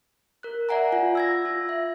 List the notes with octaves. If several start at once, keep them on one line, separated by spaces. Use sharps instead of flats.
A#4 F#6
D5 E5 F#5 G#5 A#5
F4
E6 G#6 A#6
F4
E5